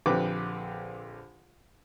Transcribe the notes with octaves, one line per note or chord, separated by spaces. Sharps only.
A#1 D3 C4 G4 B4 D6